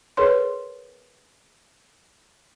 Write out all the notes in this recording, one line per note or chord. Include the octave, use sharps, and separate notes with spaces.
G#4 A#4 B4 C#5 C6